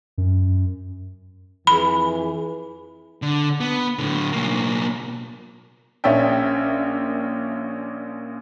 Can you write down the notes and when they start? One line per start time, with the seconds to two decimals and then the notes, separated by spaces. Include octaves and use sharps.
0.18 F#2
1.67 F2 E3 G#4 B5
3.22 D3
3.60 B3
3.99 A2 D3
4.32 B1 A#3
6.04 A#1 A#2 C#4 D5 E5 G5